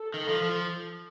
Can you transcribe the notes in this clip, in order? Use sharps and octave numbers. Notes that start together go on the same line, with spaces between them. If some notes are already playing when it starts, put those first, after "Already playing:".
Already playing: A4
D#3
F3
F3